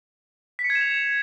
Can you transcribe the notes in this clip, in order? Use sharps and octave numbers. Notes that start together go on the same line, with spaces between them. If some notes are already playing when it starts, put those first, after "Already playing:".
B6
C#7
G#6
E7
F7